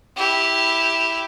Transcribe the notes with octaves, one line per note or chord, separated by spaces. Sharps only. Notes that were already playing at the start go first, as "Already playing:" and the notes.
E4 G4